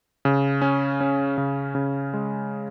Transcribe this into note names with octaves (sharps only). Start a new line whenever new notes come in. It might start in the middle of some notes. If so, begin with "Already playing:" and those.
C#3
C#4
C#4
C#3
C#3
G#3